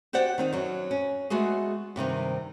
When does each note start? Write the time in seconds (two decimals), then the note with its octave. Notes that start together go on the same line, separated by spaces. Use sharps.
0.13 F#4 G4 C5 D5 F#5 G5
0.38 D#3 C4 D#4
0.53 F#2 F#3
0.91 C#4
1.30 G#3 A3 B3 F#4 G#4
1.96 G2 C3 D#3 C4